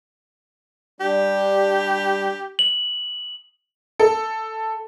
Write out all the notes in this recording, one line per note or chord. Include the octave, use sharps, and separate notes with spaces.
G3 D4 G4
F#7
A4